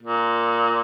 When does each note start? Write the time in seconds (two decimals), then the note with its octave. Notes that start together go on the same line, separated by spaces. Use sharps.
0.03 A#2